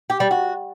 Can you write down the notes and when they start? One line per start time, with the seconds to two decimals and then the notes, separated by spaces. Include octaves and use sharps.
0.10 G4
0.20 G3
0.31 F#4